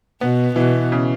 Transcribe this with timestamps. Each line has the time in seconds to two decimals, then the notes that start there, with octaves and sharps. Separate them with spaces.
0.21 B2 B3
0.56 B2 E3
0.92 C#3